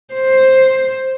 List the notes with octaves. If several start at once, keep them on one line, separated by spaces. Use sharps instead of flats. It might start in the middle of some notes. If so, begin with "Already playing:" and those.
C5